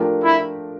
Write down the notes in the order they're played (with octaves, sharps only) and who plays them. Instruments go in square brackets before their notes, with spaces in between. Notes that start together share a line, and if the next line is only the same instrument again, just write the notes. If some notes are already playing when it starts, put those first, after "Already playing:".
Already playing: [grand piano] F3 A3 D4 G4 A#4
[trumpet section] E4